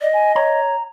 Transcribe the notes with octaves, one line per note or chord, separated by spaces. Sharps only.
D5 D#5
G#5
C#5 A#5